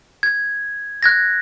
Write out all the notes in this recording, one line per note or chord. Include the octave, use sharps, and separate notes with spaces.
G#6
F#6 G#6 A#6